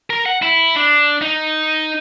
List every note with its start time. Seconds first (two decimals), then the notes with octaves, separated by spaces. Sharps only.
0.10 A#4
0.26 F#5
0.42 E4
0.76 D4
1.22 D#4